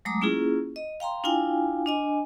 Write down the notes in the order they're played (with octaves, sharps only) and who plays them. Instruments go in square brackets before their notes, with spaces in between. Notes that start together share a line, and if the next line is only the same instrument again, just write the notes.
[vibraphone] F#3 G#3 A3 A#5 D6 D#6
A#3 C#4 E4 F4 G#4
D#5
F5 G5 A#5 C6
D4 E4 F4 F5 G5 G#5
D4 D#5 G#5